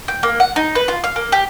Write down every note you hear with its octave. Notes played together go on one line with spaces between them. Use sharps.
G5
A#3
F#5
D#4
B4
F4
F5
A#3
G4